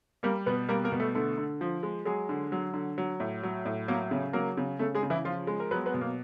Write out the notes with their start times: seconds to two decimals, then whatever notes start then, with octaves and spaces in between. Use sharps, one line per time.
0.23 G3 A#3 A#4
0.46 B2 B3 B4
0.69 G3 A#3 A#4
0.84 A#3 A#4
0.92 B2
1.00 A3 A4
1.15 D3 A3 A4
1.38 D3
1.61 F3
1.83 G#3
2.05 F#3 G#3 G#4
2.29 D3
2.52 F#3
2.74 D3
2.98 F#3
3.20 A2
3.43 F#3
3.66 A2
3.88 F#3 A#3 A#4
4.11 C#3
4.33 F#3 A#3 A#4
4.57 C#3
4.79 C#3 A3 A4
4.95 G#3 G#4
5.03 C#3
5.10 E3 E4
5.25 F3 F4
5.47 G#3
5.60 A#4
5.71 F#3 B3 B4
5.86 B3 B4
5.94 B2
6.01 A#3 A#4